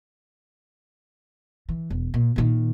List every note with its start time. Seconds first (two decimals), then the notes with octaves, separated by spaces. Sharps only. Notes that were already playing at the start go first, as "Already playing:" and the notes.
1.69 E3
1.90 E1
2.14 A#2
2.36 A#2 D#3